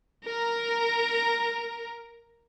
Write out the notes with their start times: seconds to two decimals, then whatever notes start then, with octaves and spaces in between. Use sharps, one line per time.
0.24 A#4 A#5